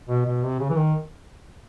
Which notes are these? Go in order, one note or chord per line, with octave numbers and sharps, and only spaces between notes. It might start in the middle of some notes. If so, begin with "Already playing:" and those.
B2
B2
C3
C#3
E3
D#3